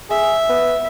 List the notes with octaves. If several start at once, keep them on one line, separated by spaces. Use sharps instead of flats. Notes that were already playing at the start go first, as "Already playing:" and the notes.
G#4 E5
B3